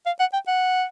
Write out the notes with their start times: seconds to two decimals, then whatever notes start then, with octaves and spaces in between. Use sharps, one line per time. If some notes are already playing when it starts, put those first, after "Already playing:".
0.06 F5
0.20 F#5
0.33 G5
0.47 F#5